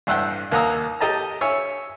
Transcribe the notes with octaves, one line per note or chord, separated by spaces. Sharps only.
A1 G2 E5 F#5 G5
D#2 A#3 F#5 A#5 D#6 E6
G4 A4 D#5 A5 A#5
C#5 E5 G#5